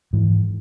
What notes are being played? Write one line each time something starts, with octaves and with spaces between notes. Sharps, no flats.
G#2 E3